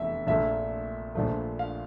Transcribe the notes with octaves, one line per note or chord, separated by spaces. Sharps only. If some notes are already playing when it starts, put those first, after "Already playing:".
Already playing: F1 E2 F3 E5
A#1 A#2 A3 E5
A#1 A#2 F3 A3
F5